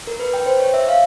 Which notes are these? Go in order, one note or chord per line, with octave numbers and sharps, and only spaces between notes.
A#4
B4
G5
C5
C#5
E5
F5